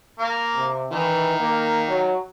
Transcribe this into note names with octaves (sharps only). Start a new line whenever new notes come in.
A#3
C3
D#3 E3
A#3
F#3